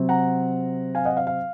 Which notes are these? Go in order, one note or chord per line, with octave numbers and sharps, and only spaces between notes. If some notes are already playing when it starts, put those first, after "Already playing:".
Already playing: C3 F#3 C4
F#5 A#5
F5 G#5
D#5 F#5
F5
F5